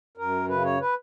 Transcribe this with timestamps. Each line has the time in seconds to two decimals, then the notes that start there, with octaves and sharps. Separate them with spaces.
0.17 F#2 A#4
0.49 C#3 B4
0.64 C#5
0.80 B4